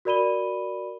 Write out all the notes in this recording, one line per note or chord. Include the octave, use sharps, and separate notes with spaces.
F#4 A#4 D5 B5 D#7 G7